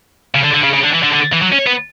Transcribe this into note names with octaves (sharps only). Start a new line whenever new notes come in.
C#3
D3
D3
C#3
C#3
D3
E3
D3
D3
E3
F#3
C#4
B3